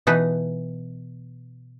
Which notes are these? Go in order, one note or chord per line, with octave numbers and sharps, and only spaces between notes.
B2 E3 D#4 B4